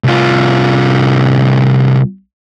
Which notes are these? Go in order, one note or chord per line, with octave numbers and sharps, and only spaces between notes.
C2 F4